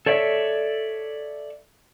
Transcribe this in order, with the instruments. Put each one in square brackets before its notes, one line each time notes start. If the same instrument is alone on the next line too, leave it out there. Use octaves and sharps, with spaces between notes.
[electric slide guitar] A4 C#5 D5 E5